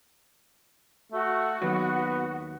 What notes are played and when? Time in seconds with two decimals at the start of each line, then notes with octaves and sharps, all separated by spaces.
1.12 A3 F#4
1.62 D#2 F#3 B3